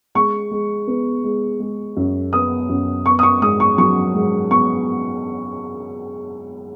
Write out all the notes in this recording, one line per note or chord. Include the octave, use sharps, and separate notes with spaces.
G#3 C#6
G#3
B3
G#3
G#3
F#2
B3 D#6
F#2
B3 C#6
D#6
C#6
G#2 D#6
C#6
F#3 C#6
G#2
B3 C#6